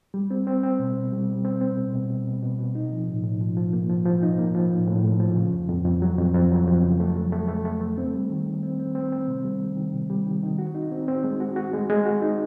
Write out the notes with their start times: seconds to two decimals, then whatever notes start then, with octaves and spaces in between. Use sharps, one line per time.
0.14 G3
0.31 C4
0.47 C4
0.63 C4
0.79 B2
0.96 B2
1.12 G3
1.29 G3
1.45 C4
1.61 C4
1.77 B2
1.94 B2
2.10 B2
2.27 B2
2.43 B2
2.59 B2
2.75 D#4
2.92 F3
3.08 A2
3.24 A2
3.41 F3
3.57 F3
3.73 A#3
3.90 F3
4.05 F3
4.23 D#4
4.38 A#3
4.55 F3
4.71 A2
4.87 A2
5.04 A2
5.20 F3
5.36 C#3
5.53 F2
5.69 F2
5.85 F2
6.02 F#3
6.18 F2
6.34 F2
6.51 F#3
6.67 F2
6.83 C#3
7.00 A3
7.16 F#3
7.32 A3
7.48 A3
7.65 A3
7.81 A3
7.98 C4
8.14 G3
8.30 D#3
8.46 D#3
8.63 C4
8.79 C4
8.95 C4
9.12 C4
9.28 C3
9.45 G3
9.61 D#3
9.77 D#3
9.94 C3
10.10 G3
10.26 D#3
10.43 D#3
10.58 F#4
10.75 D#4
10.92 C4
11.08 C4
11.24 G#3
11.40 F#4
11.56 F#4
11.73 G#3
11.90 G#3
12.05 F#4
12.22 D#4